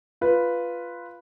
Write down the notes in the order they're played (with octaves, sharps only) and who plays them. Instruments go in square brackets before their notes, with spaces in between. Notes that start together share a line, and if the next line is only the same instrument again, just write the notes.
[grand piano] F4 B4